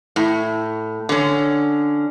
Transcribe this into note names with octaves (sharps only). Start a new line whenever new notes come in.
A2
D3 C#4